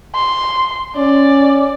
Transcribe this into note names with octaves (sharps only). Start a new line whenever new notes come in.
C6
C#4 D5